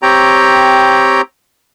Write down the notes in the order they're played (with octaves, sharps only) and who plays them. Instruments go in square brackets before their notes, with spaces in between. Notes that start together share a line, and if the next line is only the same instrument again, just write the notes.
[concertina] C4 G4 C#5 G5 A#5